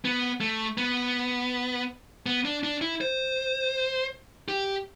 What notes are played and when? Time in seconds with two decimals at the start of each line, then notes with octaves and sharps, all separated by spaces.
0.05 B3
0.41 A3
0.78 B3
2.26 B3
2.45 D4
2.64 D4
2.81 E4
3.01 C5
4.48 G4